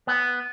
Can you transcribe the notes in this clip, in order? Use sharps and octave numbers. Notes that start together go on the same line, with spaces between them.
B3